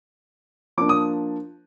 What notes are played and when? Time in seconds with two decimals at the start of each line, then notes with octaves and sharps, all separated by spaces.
0.78 F3 A#3 D4 D6
0.89 D#6